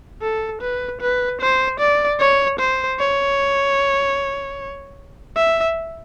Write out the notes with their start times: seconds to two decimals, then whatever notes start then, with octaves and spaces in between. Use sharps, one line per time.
0.22 A4
0.61 B4
1.01 B4
1.41 C5
1.80 D5
2.20 C#5
2.59 C5
2.99 C#5
5.36 E5